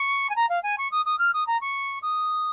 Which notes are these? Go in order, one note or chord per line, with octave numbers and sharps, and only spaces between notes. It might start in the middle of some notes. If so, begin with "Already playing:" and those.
Already playing: C#6
G#5
A#5
F5
G#5
C#6
D#6
D#6
F6
D#6
A#5
C#6
D#6